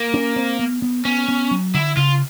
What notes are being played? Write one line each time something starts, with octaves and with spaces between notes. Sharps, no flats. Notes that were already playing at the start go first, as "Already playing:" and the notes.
Already playing: A#3
C#4
C4
B3
B3
B3 C#4
B3
F#3
D3 E4
C#3 F4